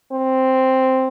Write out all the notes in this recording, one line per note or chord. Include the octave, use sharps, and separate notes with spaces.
C4